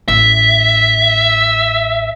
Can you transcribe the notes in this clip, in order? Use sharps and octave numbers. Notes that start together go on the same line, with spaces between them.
A1 E5